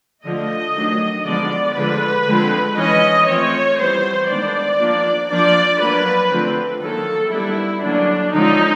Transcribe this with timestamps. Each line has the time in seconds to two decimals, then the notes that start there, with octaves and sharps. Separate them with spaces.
0.25 D3 F3 A3 D#5
0.76 D#3 F#3 A3 D4
1.26 D3 F3 G#3 B3 D4 D5
1.77 D3 F3 G#3 B4
2.28 D3 F3 G#3 C4
2.78 E3 G#3 C#4 D#5
3.28 F3 A3 C4 C#5
3.79 E3 G3 B3 C5
4.30 D#3 G#3 B3 D4 D5
4.80 F3 A#3 D4
5.30 F3 A#3 D4 D5
5.81 F#3 A#3 D4 B4
6.32 D3 F3 A3 C4
6.82 D#3 F#3 A#3 A4
7.32 G3 B3 D4 E4
7.83 D3 F#3 A#3 C#4 D4
8.34 D3 F3 G#3 C#4 D#4